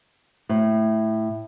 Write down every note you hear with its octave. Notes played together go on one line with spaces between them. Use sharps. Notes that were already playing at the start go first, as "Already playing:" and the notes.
A2